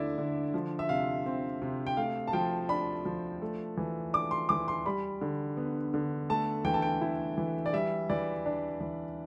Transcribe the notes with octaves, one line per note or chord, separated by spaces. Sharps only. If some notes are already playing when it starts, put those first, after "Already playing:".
Already playing: D3 A3 E4 D5 E5
D3
F3
E5
C3 F5
C4
C3
G5
A3 F5
A5
F3 G5
D4 B5
F3
A3
E3
D4 D6
C6
E3 D6
C6
G3 B5
D3
B3
D3
A3 A5
E3 G5
A5
G5
E4
E3
D5
G3 E5
E3 D5
D4
E3